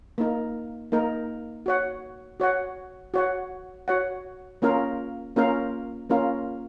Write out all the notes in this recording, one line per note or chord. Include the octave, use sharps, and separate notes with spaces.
A#3 D#4 A#4
A#3 D#4 A#4
F#4 C#5 F#5
F#4 C#5 F#5
F#4 C#5 F#5
F#4 C#5 F#5
A#3 C#4 F4 A#4 F5
A#3 C#4 F4 A#4 F5
A#3 C#4 F4 A#4 F5